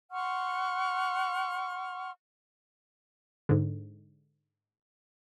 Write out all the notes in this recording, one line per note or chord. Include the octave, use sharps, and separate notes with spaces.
F#5 C6 C#6 F6
G#2 D3